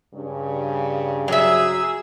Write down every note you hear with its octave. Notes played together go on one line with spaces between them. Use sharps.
G2 C#3
F#3 G#4 E5 E6